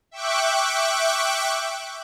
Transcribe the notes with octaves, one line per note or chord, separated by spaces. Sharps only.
E5 G5 C#6 D6 F#6